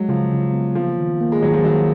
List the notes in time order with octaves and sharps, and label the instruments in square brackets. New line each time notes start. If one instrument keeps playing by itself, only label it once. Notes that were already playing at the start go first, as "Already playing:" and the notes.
Already playing: [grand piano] F#3 [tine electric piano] G#3
[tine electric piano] C#3 [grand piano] F3
[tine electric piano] C#3
B3
[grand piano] F3 [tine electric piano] A#3
[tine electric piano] D#3
A#3
[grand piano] G#3
[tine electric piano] D#3 [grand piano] F#3
[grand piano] F3
[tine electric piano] D#3 [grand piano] F#3